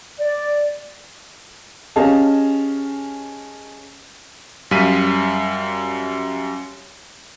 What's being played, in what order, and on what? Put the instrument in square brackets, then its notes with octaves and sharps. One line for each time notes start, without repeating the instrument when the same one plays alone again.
[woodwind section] D5
[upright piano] C#4 G4 G#4 D#5 F5 A5
[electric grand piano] F#2 G3 F5 B6 D#7